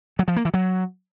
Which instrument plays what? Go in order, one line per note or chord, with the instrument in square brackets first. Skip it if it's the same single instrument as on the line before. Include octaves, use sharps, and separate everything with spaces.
[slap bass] F#3
F3
A#3
E3
F#3